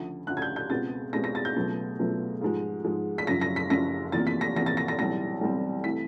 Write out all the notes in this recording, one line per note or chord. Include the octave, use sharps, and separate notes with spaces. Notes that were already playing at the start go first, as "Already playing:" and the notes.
Already playing: D2 C#3 F3
D2 C#3 F3 F#6
G#6
G6
G6
C#2 B2 G#3 C4 A6
C#2 B2 G#3 C4 A#6
A#6
A6
G6
C#2 B2 F#3 A3
C#2 B2 F#3 A3
G#2 F3 G#3
G#2 F3 G#3
B6
F#1 F#2 C#3 F3 A#6
A#6
B6
F#1 F#2 C#3 F3 A#6
E2 C3 F3 A#3 A6
B6
A#6
E2 C3 F3 A#3 A#6
A6
A#6
A#6
B1 A2 E3 G3 C4 A#6
B1 A2 E3 G3 C4
C3 E3 A3 B6